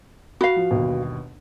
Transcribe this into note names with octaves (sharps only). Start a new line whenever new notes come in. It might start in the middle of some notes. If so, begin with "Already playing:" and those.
F#4 F5 F#5 B5
F3
G1 D#2 B2